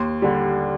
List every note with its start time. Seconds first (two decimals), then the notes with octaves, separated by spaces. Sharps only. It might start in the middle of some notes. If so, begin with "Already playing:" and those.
Already playing: D#2 C6
0.22 D3 G3